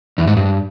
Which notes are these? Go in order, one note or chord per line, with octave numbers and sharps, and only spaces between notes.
E2
G#2
G2